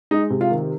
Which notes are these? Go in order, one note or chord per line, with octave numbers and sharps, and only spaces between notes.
G#3 D#4
C3
F4
D#3